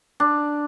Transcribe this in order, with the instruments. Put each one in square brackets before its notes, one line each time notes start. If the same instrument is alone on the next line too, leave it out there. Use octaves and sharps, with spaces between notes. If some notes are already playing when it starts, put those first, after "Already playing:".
[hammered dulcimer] D4